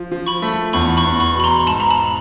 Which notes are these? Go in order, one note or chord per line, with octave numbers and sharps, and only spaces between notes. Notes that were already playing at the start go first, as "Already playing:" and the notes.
Already playing: F3
F3
B5 C#6
A3
E2 B5 C#6
B5 C#6
E2
B5 C#6
B2 B5
A#5 C6
G#2 A5 B5
A#5
A5 B5